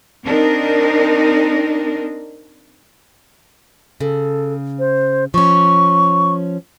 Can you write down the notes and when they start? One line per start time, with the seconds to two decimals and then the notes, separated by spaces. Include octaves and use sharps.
0.25 C4 D4 D#4 A#4
4.00 C#3 A4
4.79 C5
5.34 F3 C#4 C#6